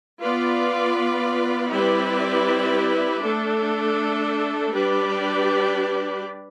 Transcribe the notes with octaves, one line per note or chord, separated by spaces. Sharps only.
B3 F4 B4 D5
G3 C4 E4 B4 D5
A3 D4 A4
G3 D4 G4 B4 D5